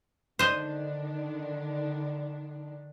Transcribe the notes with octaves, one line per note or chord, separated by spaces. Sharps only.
D3 D#3 D4 C5 D#5